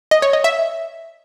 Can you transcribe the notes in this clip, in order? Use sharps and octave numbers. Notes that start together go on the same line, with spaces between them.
D#5
C#5
D#5
E5